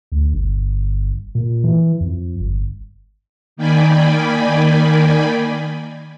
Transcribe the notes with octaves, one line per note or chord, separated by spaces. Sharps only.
D2
G1
A#2
E3
F2
G1
D#3 A#3 D5 G5 G#5 B5